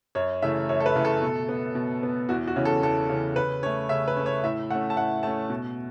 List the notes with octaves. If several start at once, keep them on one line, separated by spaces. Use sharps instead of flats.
F#2 C#5
C#3 E3 A3 E5
F#2 C#5
A4
B4
C#3 E3 A3
A4
B2
B3
B2
B3
E2 F#4
F#4
C#3 E3 C#4
A4
E2 A4
C#3 E3 C#4
C#3 B4
A3 C#4 C#5
C#3 E5
B4
A3 C#4
C#5
A2 E5
A3 C#4 F#5
A5
A2 F#5
A3 C#4 A5
B2